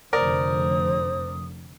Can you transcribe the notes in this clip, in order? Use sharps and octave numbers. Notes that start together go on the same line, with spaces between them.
F1 F2 D3 A#4 C5 D5 D#6